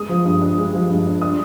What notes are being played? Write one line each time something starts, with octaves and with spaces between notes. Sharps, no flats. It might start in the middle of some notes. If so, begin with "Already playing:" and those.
Already playing: G#3 D#6
F3
G2
D4
G#3
F3
G2
D4
D4 D#6